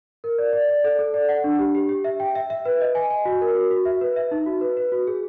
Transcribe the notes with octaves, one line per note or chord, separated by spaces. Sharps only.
A#4
D5
D5
D5
A4
A4
D5
F#5
D4
G4
G4
G4
E5
G5
E5
E5
B4
D#5
G#5
G#5
F#4
A#4
F#4
F#4
E5
B4
E5
D#4
F#4
B4
B4
F#4
G#4